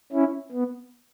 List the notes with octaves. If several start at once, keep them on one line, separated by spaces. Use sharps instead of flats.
C#4 E4
B3